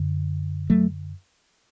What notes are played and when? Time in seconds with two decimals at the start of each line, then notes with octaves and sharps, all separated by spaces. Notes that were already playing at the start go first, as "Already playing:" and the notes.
Already playing: F#2 D3
0.70 F#3 A3